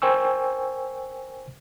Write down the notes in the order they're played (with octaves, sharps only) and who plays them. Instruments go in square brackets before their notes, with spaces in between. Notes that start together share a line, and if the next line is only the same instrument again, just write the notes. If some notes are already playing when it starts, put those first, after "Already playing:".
[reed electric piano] A#4 C5 G5 G#5 C#6 E6